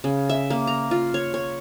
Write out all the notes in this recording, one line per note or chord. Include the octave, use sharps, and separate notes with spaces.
C#3
E5
A#3
A#5
F4
C#5
C#5